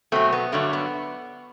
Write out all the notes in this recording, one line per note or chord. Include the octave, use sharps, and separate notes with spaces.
B2 F#3 A3 C4
B3
G2 D3 F#3 A3
B3